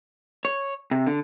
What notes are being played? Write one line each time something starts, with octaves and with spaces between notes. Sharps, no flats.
C#5
C3
D3